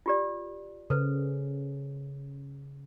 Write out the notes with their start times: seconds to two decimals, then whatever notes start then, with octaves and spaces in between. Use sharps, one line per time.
0.06 F4 G4 D5
0.90 C#3 A4 B4 C5